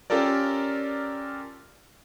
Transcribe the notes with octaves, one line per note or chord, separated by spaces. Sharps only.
C#4 F4 G4 A4 A#4 D5